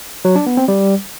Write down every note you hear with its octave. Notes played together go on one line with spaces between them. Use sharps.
F#3
D4
B3
C4
G3